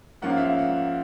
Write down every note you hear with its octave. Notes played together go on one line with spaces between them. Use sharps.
G#2 F3 A#3 C#4 F#5
F5
E5
F5
F#5